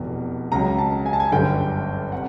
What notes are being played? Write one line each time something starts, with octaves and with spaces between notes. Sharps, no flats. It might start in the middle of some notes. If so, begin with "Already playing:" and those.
Already playing: F1 E2 B2
C#2 C#3 F#3 A#5
A5
G#5
A5
G#5
G1 F#2 D3 G3 G5
C3 F#5